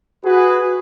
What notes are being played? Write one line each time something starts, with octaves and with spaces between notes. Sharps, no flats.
F#4 G#4 B4